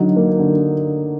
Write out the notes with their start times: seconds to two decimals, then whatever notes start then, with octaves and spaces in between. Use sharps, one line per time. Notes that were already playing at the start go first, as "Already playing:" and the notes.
Already playing: D3 F#3 D#4
0.16 A#3
0.39 D3